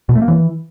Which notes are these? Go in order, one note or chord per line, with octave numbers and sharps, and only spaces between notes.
B2
A3
A#3
E3